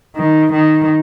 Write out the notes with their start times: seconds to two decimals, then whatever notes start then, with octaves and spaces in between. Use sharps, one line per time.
0.16 D#3
0.53 D#3